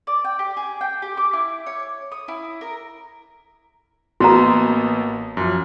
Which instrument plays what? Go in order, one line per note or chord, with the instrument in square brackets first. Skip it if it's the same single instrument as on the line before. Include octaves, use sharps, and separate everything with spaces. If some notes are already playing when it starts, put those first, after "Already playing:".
[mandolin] D5
G5
G4
G#4
G5
G4
D6
E4
C#5
D#6
E4
A#4
[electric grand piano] A1 A#3 B3 [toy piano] F#4 A#5
[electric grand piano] F#2 F3